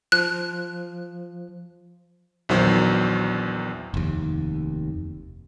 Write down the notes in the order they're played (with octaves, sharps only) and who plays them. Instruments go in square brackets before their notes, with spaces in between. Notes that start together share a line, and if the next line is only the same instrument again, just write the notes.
[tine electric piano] F3 [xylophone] F#6
[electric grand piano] A#1 E2 D#3 F#3 C5
[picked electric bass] F1 D#2